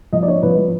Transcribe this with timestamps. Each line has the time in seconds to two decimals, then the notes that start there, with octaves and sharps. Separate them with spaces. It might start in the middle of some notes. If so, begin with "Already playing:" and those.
0.13 F3 D#5
0.23 D5
0.28 D4 C#5
0.43 F3 B4
0.58 F3